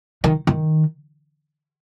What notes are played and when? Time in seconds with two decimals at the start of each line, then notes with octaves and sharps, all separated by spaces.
0.24 D#3
0.47 D#3